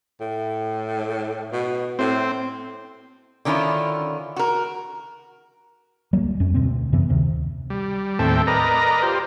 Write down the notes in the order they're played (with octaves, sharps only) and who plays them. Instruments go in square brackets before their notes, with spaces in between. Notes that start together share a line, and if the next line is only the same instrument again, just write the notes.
[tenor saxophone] A2
B2
[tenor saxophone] A2 [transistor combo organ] C4
[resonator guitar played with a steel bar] D3 D#3 C#4 E4 F4
F#4 A#4
[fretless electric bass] D1 F#3 G3 A#3
F2 C#4
D2 B2 C4
F#2 C3 E3 B3
D2 C3 D#3
[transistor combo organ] G3
D#2 A2 C4 A4 E5 G5
A#4 B4 D5 D#5 A#5
F4 G4 C5